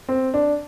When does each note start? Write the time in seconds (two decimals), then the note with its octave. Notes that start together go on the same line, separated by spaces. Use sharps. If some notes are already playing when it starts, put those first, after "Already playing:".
0.09 C4
0.34 D4